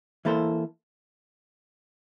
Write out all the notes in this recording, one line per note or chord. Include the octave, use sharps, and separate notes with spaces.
E3 A#3 E4 A4 C5